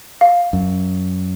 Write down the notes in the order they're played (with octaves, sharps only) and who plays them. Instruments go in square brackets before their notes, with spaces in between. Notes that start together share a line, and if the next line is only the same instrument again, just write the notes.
[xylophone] F5
[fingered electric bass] F#2